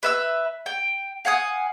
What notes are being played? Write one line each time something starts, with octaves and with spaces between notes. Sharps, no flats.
B4 E5 E6
G5
F5 F#5 G#5 D#6